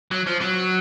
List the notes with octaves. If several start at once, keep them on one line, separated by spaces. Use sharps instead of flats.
F#3
F3
F#3